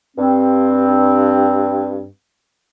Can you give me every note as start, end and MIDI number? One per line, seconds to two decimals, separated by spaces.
0.16 2.05 43
0.16 2.05 60